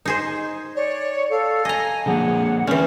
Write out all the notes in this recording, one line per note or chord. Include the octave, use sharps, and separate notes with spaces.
D#4 G#4 C5
C#5 D5
A4 F5
D#5 G#5 A#5
D3 F3 A#3 G#4 F#5
E3 C4 C#4 C5 D5